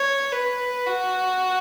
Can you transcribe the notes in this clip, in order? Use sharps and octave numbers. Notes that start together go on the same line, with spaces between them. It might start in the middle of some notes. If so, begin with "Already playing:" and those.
Already playing: C#5
B4
F#4